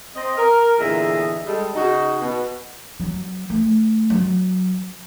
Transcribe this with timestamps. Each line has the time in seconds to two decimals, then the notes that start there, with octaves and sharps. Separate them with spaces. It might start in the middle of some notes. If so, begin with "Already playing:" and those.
0.16 C4 D#5
0.38 A#4
0.79 E2 A#2 D3 G#4 D#5 E5
1.46 G3 G#3 A4
1.75 C#3 D#4 F#4
2.21 B2
3.00 F#3
3.50 A3
4.10 F#3